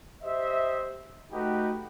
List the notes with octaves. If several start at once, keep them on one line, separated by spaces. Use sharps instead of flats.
G4 C5 D#5 E5
A3 D#4 F#4 G4 B4